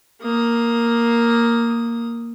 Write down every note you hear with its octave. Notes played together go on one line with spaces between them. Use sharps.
A#3 D#6